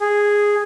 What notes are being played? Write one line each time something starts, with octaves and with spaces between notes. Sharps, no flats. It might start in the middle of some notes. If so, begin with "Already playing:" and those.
G#4